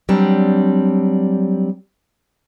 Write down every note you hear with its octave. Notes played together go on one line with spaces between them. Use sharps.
F#3 G3 C4 D4